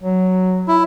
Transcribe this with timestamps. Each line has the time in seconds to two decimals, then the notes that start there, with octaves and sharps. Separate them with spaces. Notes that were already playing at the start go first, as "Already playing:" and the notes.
0.03 F#3
0.68 E4